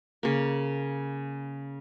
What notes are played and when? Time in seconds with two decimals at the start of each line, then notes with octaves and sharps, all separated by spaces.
0.23 C#3 A#3